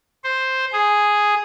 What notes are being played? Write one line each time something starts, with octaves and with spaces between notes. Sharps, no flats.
C5
G#4